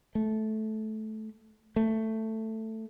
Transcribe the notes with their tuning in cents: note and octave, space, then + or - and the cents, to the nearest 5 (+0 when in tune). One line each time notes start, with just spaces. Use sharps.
A3 -15
A3 +10